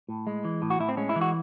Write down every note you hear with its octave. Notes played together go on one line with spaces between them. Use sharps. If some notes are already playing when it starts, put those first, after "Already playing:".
A2
G#3
E3
A2
F#4
A2 E4
C4
G#3 C#4
E4
E3
F#4